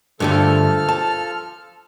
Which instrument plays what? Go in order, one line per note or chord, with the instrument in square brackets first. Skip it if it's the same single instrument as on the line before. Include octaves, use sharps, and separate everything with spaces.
[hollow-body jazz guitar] G2 D3 A3 [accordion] F3 A4 F6
[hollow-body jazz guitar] A5